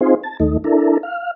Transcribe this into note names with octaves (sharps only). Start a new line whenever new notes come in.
C4 D#4 F4 G#4 C5
A5
D#2 A3 D#4
D4 E4 A4 A#4
F5